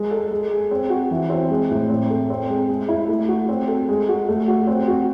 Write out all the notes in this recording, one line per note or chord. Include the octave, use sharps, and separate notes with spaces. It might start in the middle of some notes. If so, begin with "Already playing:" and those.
Already playing: G#3
A4
G#3
G#4
C4
F#4
E3
C4
G#3
A2
C4
A4
C4
G#3
G#3
E4
A3
F#4
C4
A4
G#3
F#4
A3
F#4
C4
F#4